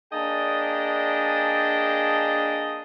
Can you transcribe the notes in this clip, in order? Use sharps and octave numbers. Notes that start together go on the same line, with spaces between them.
A#3 D4 G#4 D#5 G5 A5